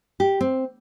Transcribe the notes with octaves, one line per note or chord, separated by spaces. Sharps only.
G4
C4